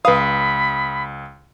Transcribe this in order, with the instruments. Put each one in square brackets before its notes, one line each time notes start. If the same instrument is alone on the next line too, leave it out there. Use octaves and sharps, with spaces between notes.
[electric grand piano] C#2 D#6 [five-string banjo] B4 F5 [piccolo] B5